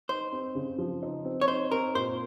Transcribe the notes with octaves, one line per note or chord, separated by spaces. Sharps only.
D#4 C5
C4
C#3
F3
D#4
C4
C#5
D#4 C5
C4 A#4
A#2 C5